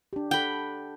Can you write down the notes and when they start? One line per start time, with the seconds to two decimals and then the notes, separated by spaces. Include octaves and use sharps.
0.13 D4 G4
0.31 A4 F#5 G5 B5